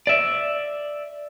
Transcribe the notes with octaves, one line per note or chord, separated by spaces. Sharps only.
D5 E5